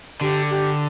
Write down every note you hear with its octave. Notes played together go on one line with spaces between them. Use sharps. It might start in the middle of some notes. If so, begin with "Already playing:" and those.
D3 G4
G4